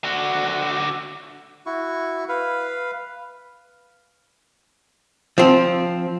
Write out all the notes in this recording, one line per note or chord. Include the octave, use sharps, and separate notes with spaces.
D3 F#4
E4 F#4 C#6
B4 F5
F3 C4